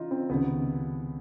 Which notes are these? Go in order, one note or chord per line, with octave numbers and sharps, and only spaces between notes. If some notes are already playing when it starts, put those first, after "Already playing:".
Already playing: C#3 E3 D#4 F4
C4
C#2 C3 D#3 B3